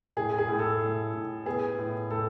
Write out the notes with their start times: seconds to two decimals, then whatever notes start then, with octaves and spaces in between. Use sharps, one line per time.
0.17 A2 G#4
0.38 G#4
0.48 A2
0.59 A4
0.81 A2
1.14 A2
1.45 B3 G#4
1.79 A2
2.10 A2 A4